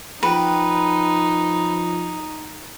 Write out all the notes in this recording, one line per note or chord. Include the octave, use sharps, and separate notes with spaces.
F3 D#4 G4 B4 F#5